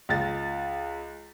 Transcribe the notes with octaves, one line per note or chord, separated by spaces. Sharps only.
C#2 A6